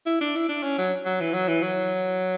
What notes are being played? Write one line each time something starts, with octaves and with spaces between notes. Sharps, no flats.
E4
D4
E4
D4
C#4
F#3
F#3
E3
F#3
E3
F#3